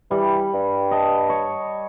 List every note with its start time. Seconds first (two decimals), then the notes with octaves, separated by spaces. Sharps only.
0.11 E3 G3
0.54 G2
0.91 D#5 A5
1.30 C#5